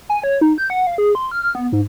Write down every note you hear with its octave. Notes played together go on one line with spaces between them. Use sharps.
G#5
C#5
D#4
G6
F#5
F5
G#4
C6
F6
B3
G#2